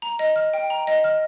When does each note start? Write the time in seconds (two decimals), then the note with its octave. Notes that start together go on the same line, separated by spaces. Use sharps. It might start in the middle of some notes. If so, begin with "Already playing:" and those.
0.02 A#5
0.19 D#5
0.36 F6
0.54 G5
0.70 A#5
0.87 D#5
1.04 F6